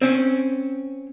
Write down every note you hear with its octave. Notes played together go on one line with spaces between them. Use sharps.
C4 C#4